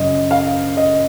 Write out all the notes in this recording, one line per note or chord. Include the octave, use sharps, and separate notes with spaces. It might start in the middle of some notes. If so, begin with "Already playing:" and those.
Already playing: F#2 C#3 D#5
F5
D#5